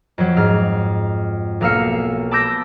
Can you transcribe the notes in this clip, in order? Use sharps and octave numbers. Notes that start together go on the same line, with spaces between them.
F2 F#3
G#2 F6
B1 A#3 F5 E6 F6 C#7
A5 B5 D6 E6 G6 A#6